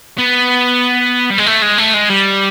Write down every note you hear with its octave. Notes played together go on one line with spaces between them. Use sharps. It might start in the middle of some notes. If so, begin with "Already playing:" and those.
B3
G3
G#3
A3
G#3
A3
G#3
G3